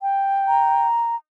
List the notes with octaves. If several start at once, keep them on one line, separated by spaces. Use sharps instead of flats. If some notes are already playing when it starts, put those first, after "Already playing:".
G5
A#5